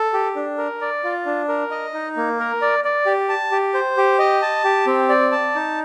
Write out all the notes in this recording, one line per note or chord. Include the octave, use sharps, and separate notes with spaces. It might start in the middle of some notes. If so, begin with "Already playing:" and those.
Already playing: A4
G4
D4
A#4
D5
F4
D4
A#4
D#5
D#4
A#3
A#4
D5
D5
G4
A5
G4
C5
G4
D#5
A5
G4
C4
D5
A5
D#4